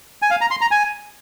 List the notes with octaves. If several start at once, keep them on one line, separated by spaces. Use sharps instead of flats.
G#5
F5
A#5
C6
A#5
G#5